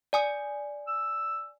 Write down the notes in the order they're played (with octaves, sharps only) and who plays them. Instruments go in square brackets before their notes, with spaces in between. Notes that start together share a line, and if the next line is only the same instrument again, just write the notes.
[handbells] D5 G#5 D#6
[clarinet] E6